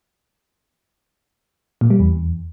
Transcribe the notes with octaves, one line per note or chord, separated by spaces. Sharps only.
A#2
G3
E2